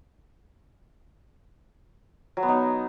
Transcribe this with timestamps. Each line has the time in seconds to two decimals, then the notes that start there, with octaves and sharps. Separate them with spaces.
2.37 F#3
2.43 B3
2.48 D#4